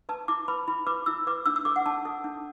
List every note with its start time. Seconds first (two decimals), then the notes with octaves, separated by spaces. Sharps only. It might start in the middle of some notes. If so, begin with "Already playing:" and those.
0.09 B4 A5
0.28 E4 D6
0.48 B4 B5
0.68 E4 B5
0.87 B4 D6
1.06 E4 E6
1.27 B4 D6
1.46 D4 E6
1.56 E6
1.65 A4 D6
1.76 F#5
1.86 D4 A5
2.05 A4
2.24 D4